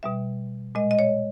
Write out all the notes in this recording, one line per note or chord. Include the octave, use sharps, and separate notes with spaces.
B2 G3 E5
A#2 G#3 D#5
D#5
C#5